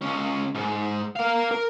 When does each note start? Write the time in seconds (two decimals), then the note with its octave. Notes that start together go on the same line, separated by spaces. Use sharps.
0.02 C#2 C#4
0.55 G#2
1.16 A#4 F5
1.51 A#4